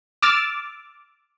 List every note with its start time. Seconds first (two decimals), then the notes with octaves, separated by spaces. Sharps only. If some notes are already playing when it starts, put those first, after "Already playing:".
0.23 D6 E6 F6 A6